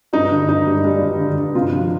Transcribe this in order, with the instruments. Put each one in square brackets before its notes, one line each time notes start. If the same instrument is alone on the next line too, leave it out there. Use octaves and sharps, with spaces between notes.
[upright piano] G2 D#4
D3
G2 D#4
G3
G3 D4
G2
D3
G2
C3 F4
F3